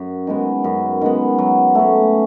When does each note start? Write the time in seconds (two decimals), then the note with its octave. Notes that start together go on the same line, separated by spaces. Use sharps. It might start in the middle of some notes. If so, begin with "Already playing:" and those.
Already playing: F#2
0.27 D#3 G#3 B3
0.64 F#2
1.01 D#3 G#3 B3
1.39 F#3
1.75 A3 C#4